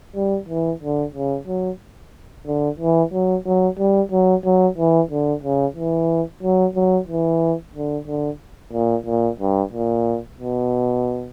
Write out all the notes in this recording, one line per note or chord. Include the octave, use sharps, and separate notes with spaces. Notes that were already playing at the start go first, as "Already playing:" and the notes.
G3
E3
D3
C#3
F#3
D3
E3
F#3
F#3
G3
F#3
F#3
E3
D3
C#3
E3
F#3
F#3
E3
D3
D3
A#2
A#2
G2
A#2
B2